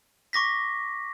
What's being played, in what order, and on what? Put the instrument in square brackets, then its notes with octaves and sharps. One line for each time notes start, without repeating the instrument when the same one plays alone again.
[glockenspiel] C#6 D6 A#6 B6